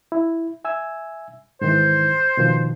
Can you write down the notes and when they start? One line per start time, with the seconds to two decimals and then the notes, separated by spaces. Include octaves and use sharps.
0.12 E4
0.65 E5 G#5 E6
1.61 G#2 D#3 E3 C5
2.37 B2 D#3 F3